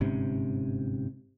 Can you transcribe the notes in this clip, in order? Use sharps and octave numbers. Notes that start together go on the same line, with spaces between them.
G1 G#2 C3 C#4